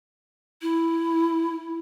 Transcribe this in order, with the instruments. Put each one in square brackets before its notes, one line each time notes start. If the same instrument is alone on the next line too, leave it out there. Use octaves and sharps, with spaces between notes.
[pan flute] E4